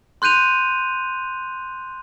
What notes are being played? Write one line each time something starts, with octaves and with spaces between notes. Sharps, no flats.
C6 F#6 G6 D#7 F7